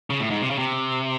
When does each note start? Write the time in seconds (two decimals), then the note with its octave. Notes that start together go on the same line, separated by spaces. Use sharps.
0.10 C#3
0.20 A2
0.31 G#2
0.42 C3
0.50 C#3
0.59 C3